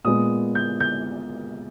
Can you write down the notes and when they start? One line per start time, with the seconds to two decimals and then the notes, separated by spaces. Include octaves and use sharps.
0.04 A#2 G#3 B3 D#6
0.55 G6
0.80 G6